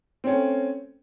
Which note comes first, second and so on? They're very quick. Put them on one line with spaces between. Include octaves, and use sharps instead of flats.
C4 C#4 A3